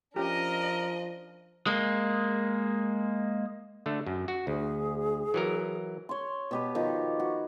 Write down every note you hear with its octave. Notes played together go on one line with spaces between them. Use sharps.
F3 C#4 D4 F4 G4 A#4 D#5
G#3 A#3
D3 A3
F#2
F#4
D2 G#4
E3 F#3 A#4
C#5 C6
B2 G4 B4
D#3 F3 D#4
F#4